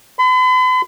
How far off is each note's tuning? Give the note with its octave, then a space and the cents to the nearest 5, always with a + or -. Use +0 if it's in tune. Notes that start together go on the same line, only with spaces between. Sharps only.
B5 +45